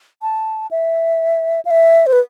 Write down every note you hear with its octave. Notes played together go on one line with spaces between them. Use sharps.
A5
E5
F5
E5
C5
B4